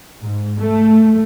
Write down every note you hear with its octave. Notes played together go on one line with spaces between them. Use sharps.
G#2
A3